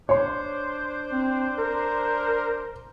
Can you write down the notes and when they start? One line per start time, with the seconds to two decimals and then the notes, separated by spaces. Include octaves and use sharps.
0.09 D4 C5 C#5 C6
1.12 C4
1.58 A#4